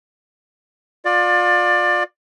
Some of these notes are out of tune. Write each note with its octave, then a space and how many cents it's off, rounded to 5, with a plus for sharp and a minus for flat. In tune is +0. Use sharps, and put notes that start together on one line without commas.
F4 +30 D5 +20